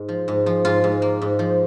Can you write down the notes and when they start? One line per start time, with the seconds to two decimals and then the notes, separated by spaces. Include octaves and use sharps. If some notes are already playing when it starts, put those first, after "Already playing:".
Already playing: G#2
0.09 F3
0.28 G#2
0.46 F3
0.65 G#2 F4
0.84 G#2
1.02 A#3
1.22 G#2
1.39 F3